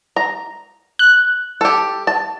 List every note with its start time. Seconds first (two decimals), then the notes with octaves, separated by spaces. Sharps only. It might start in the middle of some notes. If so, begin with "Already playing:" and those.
0.16 A#5
0.99 F#6
1.61 G4 A4
2.07 A5